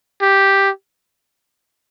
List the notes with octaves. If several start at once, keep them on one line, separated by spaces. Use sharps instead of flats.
G4